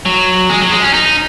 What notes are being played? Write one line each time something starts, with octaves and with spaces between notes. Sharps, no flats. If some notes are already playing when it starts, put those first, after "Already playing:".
F#3
G#3
F#3
G#3
C#4
D#4